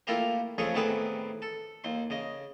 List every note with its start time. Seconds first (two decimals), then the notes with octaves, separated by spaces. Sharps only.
0.07 A3 A#3 E4 F4 G4 A#4
0.58 F2 C#3 G#3 A3 G#4 C#5
0.75 A2 C3 D#3 B3 G#4 B4
1.42 A4
1.84 D#2 C6
2.10 C#3 D#5